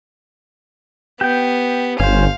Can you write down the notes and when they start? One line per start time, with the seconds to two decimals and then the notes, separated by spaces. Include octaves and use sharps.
1.21 B3 G4 G5
2.00 G1 C#4 C5 F5